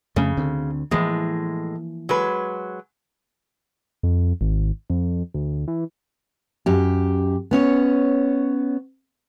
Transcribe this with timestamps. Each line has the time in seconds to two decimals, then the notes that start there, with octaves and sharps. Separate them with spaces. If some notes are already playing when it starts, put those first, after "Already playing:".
0.16 F2 C#3 A3
0.37 D2 D3 C4
0.91 A2 E3 F3 G#3 A#3
2.09 F#3 G#3 B4
4.03 F2
4.41 G#1
4.90 F2
5.34 D2
5.68 E3
6.66 F#2 G4
7.51 B3 C#4 C#5